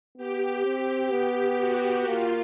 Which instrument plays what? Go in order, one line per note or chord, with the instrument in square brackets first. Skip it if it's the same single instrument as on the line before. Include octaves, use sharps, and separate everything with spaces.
[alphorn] B3 [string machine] G4
[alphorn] C4
[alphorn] B3 [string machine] G4
[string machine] F#4
[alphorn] A#3 [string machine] F4